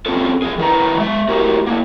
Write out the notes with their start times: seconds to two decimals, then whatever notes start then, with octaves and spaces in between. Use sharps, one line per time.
0.06 C4 C#4 F4 G#4 A4
0.42 F3 G#4
0.58 D#3 E4 B4 A#5
0.98 G#3 E5
1.29 A3 E4 F#4 G4 A#4
1.66 A#3 E4